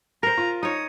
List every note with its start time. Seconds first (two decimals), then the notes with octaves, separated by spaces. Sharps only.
0.23 A#4 C5 A#5
0.38 F4
0.63 D#4 C#5 D#6